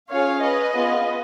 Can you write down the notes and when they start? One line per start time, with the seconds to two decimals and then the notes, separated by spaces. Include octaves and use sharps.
0.10 C#4 F4 G#4 C#5 F5
0.42 B4 D#5
0.73 B3 F4 G#4